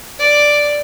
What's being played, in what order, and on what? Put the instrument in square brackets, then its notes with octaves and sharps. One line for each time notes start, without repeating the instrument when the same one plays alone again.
[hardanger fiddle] D5